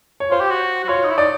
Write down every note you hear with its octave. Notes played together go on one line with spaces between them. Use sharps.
C#5
F4 C5
G4
F#4
F#4
F4 C#5
D#4
E4
D#4 D5